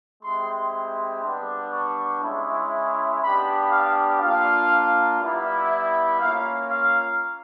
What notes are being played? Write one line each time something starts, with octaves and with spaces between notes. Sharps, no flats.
G#3 C4 E4 G4 C6
G3 B3 D4
C#6
G#3 C#4 E4
B3 D4 G4 B5
F5
A#3 D4 F4 F5
G3 B3 E4
A#3 C#4 F4 F5
F5